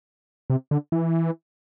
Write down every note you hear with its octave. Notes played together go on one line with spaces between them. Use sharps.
C3
D3
E3